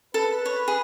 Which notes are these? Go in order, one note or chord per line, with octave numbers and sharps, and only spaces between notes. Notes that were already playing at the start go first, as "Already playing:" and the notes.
A4 B4
C#5
G#4